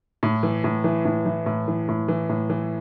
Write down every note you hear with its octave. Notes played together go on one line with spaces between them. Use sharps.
A2
E3
A2
E3
A2
E3
A2
E3
A2
E3
A2
E3